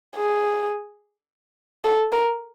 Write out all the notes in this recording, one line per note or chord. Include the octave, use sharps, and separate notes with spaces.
G#4
A4
A#4